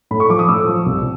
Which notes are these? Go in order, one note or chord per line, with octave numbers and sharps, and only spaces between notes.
A2 B5
C#6
F3 D6
D#6
A2 E6
F3
C2